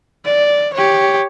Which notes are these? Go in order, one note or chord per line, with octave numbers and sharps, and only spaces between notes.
D5
G4 C#5